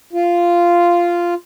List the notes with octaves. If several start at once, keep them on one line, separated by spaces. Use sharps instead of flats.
F4